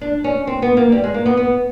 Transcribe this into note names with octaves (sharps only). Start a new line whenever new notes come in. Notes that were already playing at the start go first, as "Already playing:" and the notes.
D4
C#4
C4
B3
A#3
G3
G#3
A#3
B3
B3